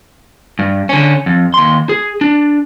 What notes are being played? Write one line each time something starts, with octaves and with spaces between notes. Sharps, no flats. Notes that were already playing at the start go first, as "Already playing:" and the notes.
G2
D3 C#4
F2
D#2 C6
G#4
D4